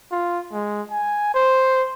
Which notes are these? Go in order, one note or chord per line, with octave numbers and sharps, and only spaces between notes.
F4
G#3
G#5
C5